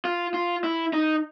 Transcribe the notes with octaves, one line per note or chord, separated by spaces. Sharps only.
F4
F4
E4
D#4